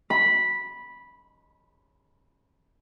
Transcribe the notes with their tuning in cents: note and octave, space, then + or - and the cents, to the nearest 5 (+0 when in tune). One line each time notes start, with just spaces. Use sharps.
B5 -10